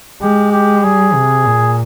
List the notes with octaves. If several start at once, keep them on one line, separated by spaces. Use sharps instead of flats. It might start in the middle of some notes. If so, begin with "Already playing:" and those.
G#3 G4
G4
G3 G#4
C3
A#2